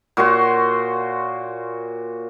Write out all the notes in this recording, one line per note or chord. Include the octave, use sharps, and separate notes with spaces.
A#2 F#4 C#5 C6